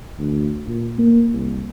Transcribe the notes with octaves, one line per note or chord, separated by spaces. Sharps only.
D2
A#2
A#3
C2